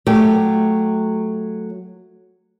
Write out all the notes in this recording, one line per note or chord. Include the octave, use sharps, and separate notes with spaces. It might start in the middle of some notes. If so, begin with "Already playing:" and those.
F#3 A3 G4